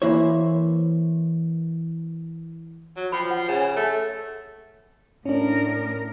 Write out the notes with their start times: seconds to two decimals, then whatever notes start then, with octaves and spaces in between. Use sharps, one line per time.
0.02 E3 A#3 E4 C5 C#5
2.96 F#3
3.12 F3 G5 B5
3.31 F#5
3.48 C#3
3.76 A3
5.25 A2 C#4 D4 A#4